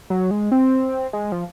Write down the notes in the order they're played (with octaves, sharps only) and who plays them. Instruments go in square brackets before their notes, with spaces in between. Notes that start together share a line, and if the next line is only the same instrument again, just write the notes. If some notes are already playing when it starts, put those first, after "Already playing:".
[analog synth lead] F#3
G#3
C4
G#3
F3